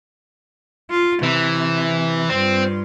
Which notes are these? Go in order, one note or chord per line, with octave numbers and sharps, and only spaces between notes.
F4
C3 E3
G2 C4 F4